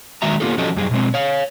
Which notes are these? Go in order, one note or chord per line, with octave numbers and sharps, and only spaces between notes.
D#3 G#3 F#4 E5 A#5
A#3 B3 F4 G4 A4
F3 C#4 F#4 G4 A4 D#5
F#2 G3 G#4
B2 G#3 C4
C#5 F5